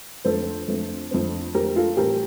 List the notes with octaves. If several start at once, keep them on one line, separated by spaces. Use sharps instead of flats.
F2 D3 A3 C4 A4 C5
F2 D3 A3 C4
F2 D3 A3 C4
F2 D3 A3 C4 G4 A#4
F4 A4
A2 E3 G3 C4 G4 A#4